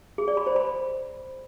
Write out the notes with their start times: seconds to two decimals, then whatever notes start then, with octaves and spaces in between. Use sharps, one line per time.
0.18 G#4
0.28 D5
0.37 B5
0.47 C5
0.56 B5